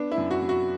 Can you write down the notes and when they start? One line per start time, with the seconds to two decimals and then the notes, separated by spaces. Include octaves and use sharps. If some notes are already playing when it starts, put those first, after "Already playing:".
Already playing: B3 D4
0.11 E4
0.18 F#2
0.31 F#4
0.42 F#3
0.49 F#4